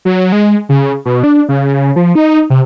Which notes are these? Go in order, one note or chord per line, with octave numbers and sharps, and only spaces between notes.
F#3
G#3
C#3
B2
D4
C#3
F3
D#4
C3